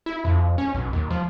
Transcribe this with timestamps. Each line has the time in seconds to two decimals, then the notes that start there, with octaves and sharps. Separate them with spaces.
0.06 E4
0.25 F2
0.58 C#4
0.75 B1
0.93 D#2
1.11 F3